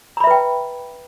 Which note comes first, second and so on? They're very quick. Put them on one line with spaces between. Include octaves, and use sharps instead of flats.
A#5 B5 E5 B4 G5